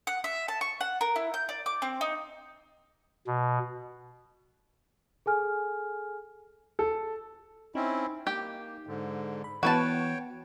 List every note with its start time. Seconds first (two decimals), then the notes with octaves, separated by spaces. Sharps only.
0.07 F#5
0.24 E5
0.48 A5
0.61 C#6
0.81 F#5
1.01 A#4
1.16 E4
1.34 G6
1.49 D5
1.66 D6
1.82 C4
2.01 D#4
3.27 B2
5.26 G#4 A4 G#5 F6
6.79 A4
7.75 C4 C#4 D#4 E4
8.27 A#3 G4 G5
8.87 G#2 D3
9.44 B5
9.63 E3 B3 F#4 B4 C#5 G5 A5